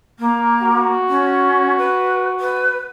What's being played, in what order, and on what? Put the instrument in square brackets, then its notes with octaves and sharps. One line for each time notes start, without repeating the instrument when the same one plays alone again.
[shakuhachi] A#3
[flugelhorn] F#4
[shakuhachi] C#4
B4
B4